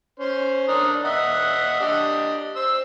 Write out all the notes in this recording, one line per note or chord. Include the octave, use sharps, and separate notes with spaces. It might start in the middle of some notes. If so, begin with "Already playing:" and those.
C#4 C5
D4 A#4 D#6
D#5 E5 F#5
D4 G4 D#5
C5 E6